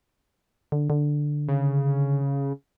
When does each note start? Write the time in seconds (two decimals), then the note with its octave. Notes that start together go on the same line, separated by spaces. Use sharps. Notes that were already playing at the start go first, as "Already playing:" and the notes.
0.72 D3
0.90 D3
1.48 C#3